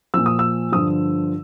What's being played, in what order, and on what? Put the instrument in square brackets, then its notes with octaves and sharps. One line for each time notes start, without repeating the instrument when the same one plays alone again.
[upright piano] A#2 F3 E6
D#6
E6
G2 D3 F3 D#6